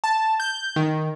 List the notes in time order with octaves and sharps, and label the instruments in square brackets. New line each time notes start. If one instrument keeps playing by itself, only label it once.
[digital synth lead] A5
G6
D#3